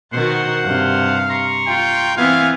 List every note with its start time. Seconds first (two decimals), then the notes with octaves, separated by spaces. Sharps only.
0.12 B2 D#3 F#4 C5 F#5 C6
0.63 G2 C3 F5
1.29 A#5 C6 C#6
1.68 F4 G5
2.17 E3 B3 C4 F5 G#5